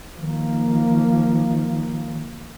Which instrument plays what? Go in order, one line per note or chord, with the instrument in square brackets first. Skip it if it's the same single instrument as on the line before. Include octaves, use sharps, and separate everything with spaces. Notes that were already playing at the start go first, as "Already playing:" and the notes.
[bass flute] D#3 [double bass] F3 A#3